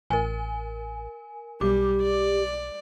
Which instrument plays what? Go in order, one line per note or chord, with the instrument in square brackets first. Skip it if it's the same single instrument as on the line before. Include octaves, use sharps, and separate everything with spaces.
[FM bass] A1 [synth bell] A#4 G#5
[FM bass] B1 [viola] G3 [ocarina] G4 [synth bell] D6
[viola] D5